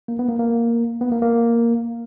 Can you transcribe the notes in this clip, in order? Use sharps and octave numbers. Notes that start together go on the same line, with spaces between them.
A#3
B3
A#3
A#3
B3
A#3
A#3